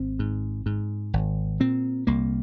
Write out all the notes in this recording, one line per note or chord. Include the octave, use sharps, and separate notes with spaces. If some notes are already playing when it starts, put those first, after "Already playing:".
Already playing: G#1 C4
G#2
G#2
G#1
A#2 C4
C2 A#3